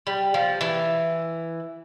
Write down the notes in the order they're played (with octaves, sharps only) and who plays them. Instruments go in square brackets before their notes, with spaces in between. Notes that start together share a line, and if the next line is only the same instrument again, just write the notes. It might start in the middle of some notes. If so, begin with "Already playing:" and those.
[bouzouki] G3
F3
E3